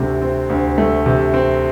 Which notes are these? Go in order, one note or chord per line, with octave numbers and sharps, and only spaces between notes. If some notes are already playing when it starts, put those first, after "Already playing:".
Already playing: D2 C3 A3
C4
D2
A3
C3
C4